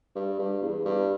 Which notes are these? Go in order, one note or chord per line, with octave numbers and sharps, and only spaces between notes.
G2
G2
E2
G2